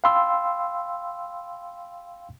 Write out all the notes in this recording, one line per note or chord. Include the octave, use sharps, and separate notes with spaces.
F5 G5 B5 C6 E6